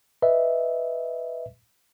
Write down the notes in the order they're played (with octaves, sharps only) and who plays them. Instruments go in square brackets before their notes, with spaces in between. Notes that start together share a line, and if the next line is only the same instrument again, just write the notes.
[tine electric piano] B4 D#5 E5